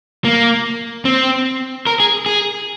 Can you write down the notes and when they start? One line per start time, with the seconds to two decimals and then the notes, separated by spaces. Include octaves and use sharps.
0.25 A#3
1.05 C4
1.87 A#4
2.00 G#4
2.26 G#4